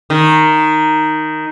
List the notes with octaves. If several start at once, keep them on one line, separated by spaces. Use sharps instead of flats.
D#3